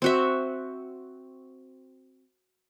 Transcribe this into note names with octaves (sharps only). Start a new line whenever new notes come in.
C4 F#4 E5